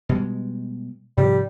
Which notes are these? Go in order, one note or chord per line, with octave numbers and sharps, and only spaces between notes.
B2 G3 G#3
G#2 C3 F3 G3